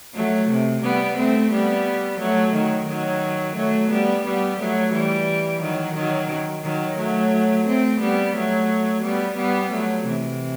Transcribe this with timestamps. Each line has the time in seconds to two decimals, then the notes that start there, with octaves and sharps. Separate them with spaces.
0.15 F#3 A3
0.49 C3
0.83 G3 B3
1.17 A3 C4
1.51 G3 B3
2.19 F#3 A3
2.54 D#3 F#3
2.88 D#3 F#3
3.56 F#3 A3
3.90 G3 B3
4.25 G3 B3
4.59 F#3 A3
4.93 E3 G3
5.61 D#3 F#3
5.95 D#3 F#3
6.63 D#3 F#3
6.97 F#3 A3
7.66 A3 C4
8.00 G3 B3
8.34 F#3 A3
9.03 G3 B3
9.37 G3 B3
9.71 F#3 A3
10.06 C3 E3